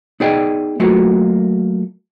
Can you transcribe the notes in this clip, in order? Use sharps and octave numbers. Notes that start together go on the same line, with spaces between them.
B3 D#4 G#4 D5 D#5 G5
F#3 A3 A#3 F4 F#4